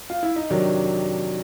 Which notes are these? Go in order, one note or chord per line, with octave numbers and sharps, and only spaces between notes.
F4
E4
D#4
F2 C3 D#3 F#3 D4